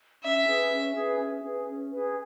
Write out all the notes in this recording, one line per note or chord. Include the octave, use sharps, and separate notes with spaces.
C#4 E5
G#4 B4
C#4
G#4 B4
C#4
G#4 B4
C#4
G#4 B4